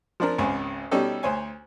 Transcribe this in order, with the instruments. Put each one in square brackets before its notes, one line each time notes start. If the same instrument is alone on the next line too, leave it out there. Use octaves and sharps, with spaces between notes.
[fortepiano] F3 C4 D4 A#4
G#1 C#2 C5 G#5
B2 G3 C#4 D#4 G4 A4
D2 C5 C#5 G#5